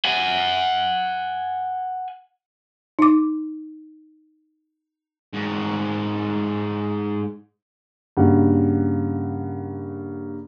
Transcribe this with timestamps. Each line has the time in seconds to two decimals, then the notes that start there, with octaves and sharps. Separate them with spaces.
0.05 F#5 G#5
2.99 D#4 D6
5.33 G#2 F#4
8.17 G2 C#3 A#3 F#4 F#5